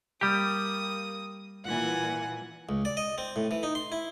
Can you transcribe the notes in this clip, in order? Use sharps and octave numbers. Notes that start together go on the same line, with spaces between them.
G3 A#3 G4 D#6
A#2 E3 F#5 G#5
C#2
D5
D#5
C4
A2
E3
D#4
C6
E4